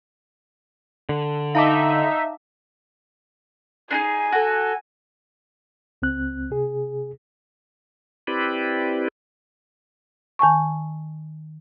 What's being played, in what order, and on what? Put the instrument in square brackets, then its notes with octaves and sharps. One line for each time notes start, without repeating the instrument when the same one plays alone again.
[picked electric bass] D3
[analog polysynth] D#4 E5 [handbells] F5 A5 D6
[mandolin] D4 D#4 G#4 [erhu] G#5
[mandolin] F#4 A4
[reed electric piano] C#2 C4 F#6
C3 G#4
[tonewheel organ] C4 E4 G4 B4 D5
[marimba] D#3 G#5 A5 C#6